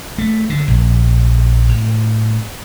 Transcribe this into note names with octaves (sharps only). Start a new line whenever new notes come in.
A3
D3
A#1
A2